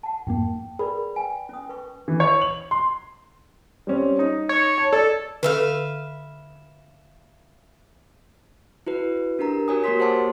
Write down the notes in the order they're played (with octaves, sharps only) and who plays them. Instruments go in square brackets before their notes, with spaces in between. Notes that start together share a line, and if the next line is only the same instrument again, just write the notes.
[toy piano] F#5 A5
[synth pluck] F2 G#2 A#3 [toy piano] G5
[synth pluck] G#4 A#4 [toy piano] B4 D5 B5
[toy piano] F5 G5 G#5
C#4 D#6
B4 C#6
[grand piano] E3
C#5
F#7
C6
[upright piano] G3 C4 C#4
D#4
[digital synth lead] C#5
[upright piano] A5
[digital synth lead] A4 [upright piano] D5
[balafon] D3 A4 [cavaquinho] B4 E5 F5
[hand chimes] E4 F#4 B4
D4 G4 A#4 A#5
F#4 A#4 C#5 G#5 D#6
A#3 F#4 G4 C#5 C6 B6
G#4 C5 F#5 A5 C6 D6